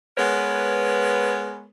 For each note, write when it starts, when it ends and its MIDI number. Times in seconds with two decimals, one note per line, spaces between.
0.18 1.66 56
0.18 1.66 59
0.18 1.66 70
0.18 1.66 71
0.18 1.66 73